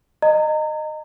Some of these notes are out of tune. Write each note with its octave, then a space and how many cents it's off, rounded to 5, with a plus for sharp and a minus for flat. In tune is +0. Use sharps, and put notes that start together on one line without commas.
D#5 -15 A#5 -30